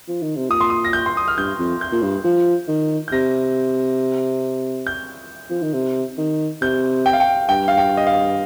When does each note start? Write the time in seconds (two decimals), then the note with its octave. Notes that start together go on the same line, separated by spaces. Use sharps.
0.08 F3
0.22 D#3
0.36 C3
0.49 A#2 D#6
0.61 C6
0.70 D#6
0.85 A#6
0.93 G6
1.06 C6
1.17 D#6
1.28 F6
1.37 G2 G6
1.59 F2
1.81 G6
1.92 A#2
2.02 G2
2.24 F3
2.68 D#3
3.08 G6
3.12 C3 A#6
4.87 G6
5.49 F3
5.62 D#3
5.73 C3
6.18 D#3
6.62 C3 G6
7.06 G5
7.13 F5
7.20 G5
7.49 G2 G5
7.68 F5
7.78 G5
7.97 D#5
8.07 F5